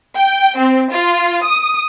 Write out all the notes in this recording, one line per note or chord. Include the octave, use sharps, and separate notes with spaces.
G5
C4
F4
D#6